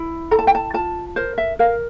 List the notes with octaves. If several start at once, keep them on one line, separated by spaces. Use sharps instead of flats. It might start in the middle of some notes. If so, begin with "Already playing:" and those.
Already playing: E4
A4 A#5
A5
G5
A5
F4 A5
A#4 C5
E5
A#4 F5